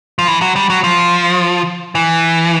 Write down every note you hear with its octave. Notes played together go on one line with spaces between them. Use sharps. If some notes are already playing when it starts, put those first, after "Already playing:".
F3
E3
F#3
G3
F#3
F3
E3